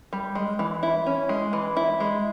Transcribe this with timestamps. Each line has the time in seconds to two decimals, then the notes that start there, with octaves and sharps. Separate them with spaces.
0.13 G3
0.35 G#3
0.59 E3
0.83 E4
1.06 C#4
1.29 G#3
1.53 E3
1.77 E4
2.00 G#3